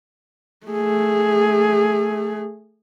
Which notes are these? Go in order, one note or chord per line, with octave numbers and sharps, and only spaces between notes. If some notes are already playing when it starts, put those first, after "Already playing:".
A3 G#4